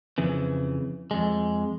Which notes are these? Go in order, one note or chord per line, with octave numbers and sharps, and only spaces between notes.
F2 C#3 E3
F2 G#3